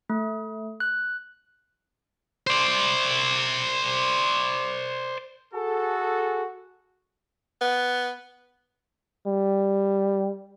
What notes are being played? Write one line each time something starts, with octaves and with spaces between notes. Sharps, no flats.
A3
F#6
C5 D5
F#4 G#4 A4
B3
G3